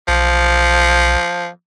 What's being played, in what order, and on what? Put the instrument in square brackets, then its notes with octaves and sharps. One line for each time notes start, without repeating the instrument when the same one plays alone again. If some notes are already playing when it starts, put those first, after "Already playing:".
[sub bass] B1 [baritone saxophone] F3